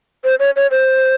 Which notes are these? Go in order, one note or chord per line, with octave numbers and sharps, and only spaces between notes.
C5
C#5
C#5
C5